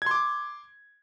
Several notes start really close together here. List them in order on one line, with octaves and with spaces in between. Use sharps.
G#6 C6 D6